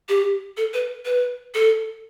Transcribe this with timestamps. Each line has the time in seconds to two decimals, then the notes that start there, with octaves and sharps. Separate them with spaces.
0.09 G4
0.57 A4
0.74 B4
1.05 B4
1.54 A4